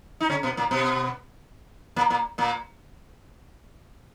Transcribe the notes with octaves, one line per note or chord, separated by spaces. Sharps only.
D#4
C#3 C#4
B2 B3
A#2 A#3
B2 B3
A#2 A#3
A#2 A#3
A#2 A#3